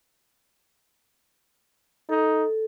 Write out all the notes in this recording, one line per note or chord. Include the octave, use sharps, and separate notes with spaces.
D#4 A4